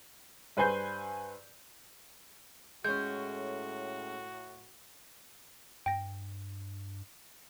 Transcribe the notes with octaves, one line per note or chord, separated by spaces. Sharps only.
G2 B4 C5 G#5 G6 C7
A2 G#3 C#4 F#4 G6
G2 G5 A#6